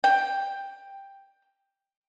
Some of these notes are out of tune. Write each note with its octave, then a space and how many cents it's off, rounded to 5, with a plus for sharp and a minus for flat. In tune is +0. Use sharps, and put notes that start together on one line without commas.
G5 +5